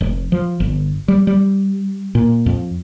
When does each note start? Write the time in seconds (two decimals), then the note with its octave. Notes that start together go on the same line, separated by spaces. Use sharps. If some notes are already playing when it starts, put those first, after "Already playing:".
0.01 F1
0.32 F3
0.60 G1
1.08 G3
1.27 G3
2.15 A#2
2.46 F2